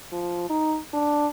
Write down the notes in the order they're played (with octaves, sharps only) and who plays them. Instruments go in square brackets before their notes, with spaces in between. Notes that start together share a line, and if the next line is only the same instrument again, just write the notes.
[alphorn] F3
D#4
D4